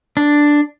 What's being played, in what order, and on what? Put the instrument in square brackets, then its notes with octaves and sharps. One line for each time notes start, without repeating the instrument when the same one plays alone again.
[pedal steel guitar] D4